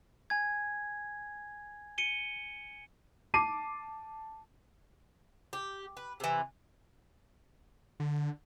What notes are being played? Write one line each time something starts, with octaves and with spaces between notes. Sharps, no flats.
G#5 G#6
C#7 D#7 G7
A5 D6 C7 D#7
G4
B4
C3 E3
D3